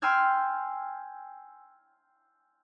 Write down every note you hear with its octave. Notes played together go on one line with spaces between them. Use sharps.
G5 G#5 C6 E6 F6 G#6